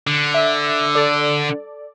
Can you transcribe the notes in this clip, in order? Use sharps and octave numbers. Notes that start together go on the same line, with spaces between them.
D3
E5
A4 D5